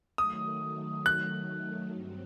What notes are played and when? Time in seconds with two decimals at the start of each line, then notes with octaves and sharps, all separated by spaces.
0.18 D#3 F#3 A3 D#6
1.06 F#6
1.94 G2 F#3 C4